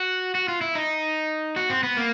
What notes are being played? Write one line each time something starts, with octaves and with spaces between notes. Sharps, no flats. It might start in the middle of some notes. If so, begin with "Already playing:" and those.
Already playing: F#4
F#4
F4
E4
D#4
F#4
C4
B3
A#3